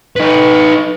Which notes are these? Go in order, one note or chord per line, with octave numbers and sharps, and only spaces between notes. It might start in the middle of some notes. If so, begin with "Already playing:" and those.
D#4 B4